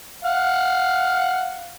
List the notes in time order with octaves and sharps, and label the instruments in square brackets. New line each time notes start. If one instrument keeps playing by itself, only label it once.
[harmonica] F5 F#5